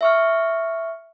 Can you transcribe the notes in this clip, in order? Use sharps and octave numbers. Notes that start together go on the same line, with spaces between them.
E5 C#6 F6